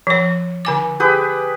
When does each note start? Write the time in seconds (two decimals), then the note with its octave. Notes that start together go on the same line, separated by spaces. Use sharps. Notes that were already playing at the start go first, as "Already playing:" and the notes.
0.07 F3 C#5
0.65 D3 G#5 D6
1.00 G4 G#4 B4